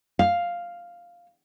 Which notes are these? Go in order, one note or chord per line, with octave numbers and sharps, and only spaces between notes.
F5